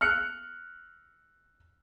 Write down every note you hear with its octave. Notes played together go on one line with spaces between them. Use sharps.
F6 F#6 C#7